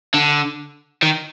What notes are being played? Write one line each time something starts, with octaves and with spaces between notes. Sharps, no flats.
D3
D#3